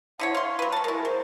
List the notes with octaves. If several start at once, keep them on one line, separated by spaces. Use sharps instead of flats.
D3 E4 C#5 F#5
F5 C6 C#6
F#3 B4
F#3 A5
G#3 E4 A#4
F#3 C5